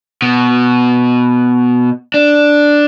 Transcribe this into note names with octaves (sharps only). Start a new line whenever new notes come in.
B2
D4